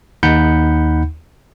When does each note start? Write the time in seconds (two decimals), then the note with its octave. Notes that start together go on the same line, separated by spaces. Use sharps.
0.23 D#2 D#4 F#5 B5 G6 C#7